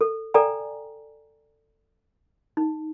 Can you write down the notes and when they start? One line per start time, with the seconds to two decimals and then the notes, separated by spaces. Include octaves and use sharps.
0.01 A4
0.34 A4 D5 G5 G#5 A#5
2.57 D#4